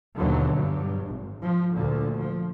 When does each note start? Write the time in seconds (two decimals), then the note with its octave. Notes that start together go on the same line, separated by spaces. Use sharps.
0.18 D#2 B2 D3 E3 F#3
0.55 G2 F#3
1.10 G#1
1.41 F3
1.74 D2 A#2 D3
2.19 F3